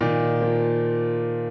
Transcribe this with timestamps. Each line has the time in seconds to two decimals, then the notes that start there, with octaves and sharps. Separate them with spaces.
0.01 A#2 D#3
0.42 F3 A#3